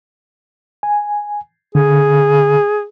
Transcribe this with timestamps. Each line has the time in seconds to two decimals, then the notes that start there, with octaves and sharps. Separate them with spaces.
0.83 G#5
1.75 D3 G#4